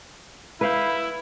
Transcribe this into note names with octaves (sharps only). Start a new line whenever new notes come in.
E4 B4 F5 G5